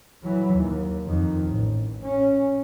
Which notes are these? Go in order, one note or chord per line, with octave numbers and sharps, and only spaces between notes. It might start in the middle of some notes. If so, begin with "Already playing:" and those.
E3 F#3
D#2
F2 D#3
A1
C#4